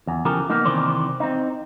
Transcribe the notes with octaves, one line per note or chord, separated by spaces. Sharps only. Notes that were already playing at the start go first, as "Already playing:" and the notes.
E2
C#3 E3 F3 G4 A4 A#4
A#3 B3 D#4
C3 D#3 E3 C5 D5
C4 D#4